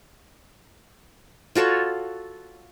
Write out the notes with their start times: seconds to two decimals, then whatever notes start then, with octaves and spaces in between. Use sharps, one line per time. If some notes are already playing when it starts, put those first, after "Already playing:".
1.55 F4 F#4 A4 C#5